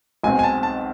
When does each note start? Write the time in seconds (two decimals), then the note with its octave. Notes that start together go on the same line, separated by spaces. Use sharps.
0.23 B1 B2 G#3 C4 G#5
0.39 G#5
0.43 A5
0.63 A5